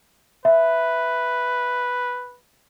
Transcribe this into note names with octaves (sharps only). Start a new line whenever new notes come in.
B4 E5